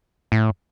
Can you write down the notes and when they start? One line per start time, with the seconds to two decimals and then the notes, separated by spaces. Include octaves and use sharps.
0.32 A2